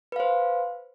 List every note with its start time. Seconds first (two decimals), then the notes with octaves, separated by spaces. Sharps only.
0.12 B4
0.16 F5
0.20 C5